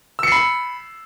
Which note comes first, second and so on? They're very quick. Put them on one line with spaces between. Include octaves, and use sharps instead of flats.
E6 C#7 C7 B5